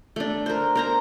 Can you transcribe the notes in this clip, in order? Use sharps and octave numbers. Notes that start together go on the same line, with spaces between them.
A3 D4
A#4 C5
A#4 C5 A#5